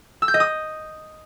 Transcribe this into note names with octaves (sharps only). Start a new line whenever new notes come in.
E6
G6
D#5
D#6